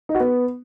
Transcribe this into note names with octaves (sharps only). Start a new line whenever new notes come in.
D#4
F#4
B3